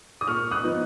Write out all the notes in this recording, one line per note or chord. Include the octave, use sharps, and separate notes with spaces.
D#6
A#2 C#6 F6
D#6 F#6
F3 B3 D#4